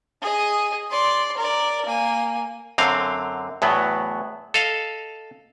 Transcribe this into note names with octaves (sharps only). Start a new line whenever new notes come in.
G#4 D#5
D5 C6
A#4 D5
A#3 G#5
F#2 D3 C4 F5
E2 A2 F#3 B3
A4 D#5 F5